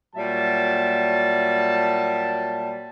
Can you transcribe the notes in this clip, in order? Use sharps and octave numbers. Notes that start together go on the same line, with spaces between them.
A#2 F#3 G3 E5 A5